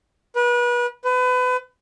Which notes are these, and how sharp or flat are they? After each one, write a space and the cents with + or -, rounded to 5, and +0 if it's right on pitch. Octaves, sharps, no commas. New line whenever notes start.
B4 -35
B4 +30